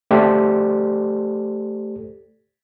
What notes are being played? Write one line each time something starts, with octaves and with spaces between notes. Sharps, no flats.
A3 G4 A4 C5 D5